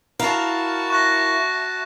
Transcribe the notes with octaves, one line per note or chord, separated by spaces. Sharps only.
E4 F#4 A#4 F5 A5
E5 C#6 F#6 A#6